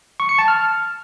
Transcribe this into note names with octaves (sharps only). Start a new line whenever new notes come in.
C#6
C#7
A5
F6